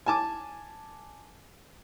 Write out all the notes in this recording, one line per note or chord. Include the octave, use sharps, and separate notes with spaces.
G#5 A5 D6